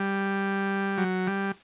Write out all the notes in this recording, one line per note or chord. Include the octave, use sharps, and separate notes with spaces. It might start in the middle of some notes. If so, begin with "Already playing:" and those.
Already playing: G3
F#3
G3